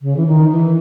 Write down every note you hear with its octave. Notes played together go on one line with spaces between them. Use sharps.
C#3
E3
D#3
E3